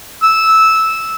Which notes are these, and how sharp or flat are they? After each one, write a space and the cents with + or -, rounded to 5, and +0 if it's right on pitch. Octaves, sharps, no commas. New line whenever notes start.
E6 -10